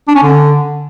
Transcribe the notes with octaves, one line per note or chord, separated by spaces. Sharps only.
D4
C#4
D3